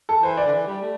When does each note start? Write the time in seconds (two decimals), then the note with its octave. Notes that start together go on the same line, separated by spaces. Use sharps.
0.09 A4
0.22 E3 C5
0.37 D5
0.46 D3
0.52 E3
0.67 G3
0.82 A3